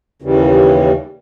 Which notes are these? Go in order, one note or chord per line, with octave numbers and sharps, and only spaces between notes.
D#2 C#3 E3 G3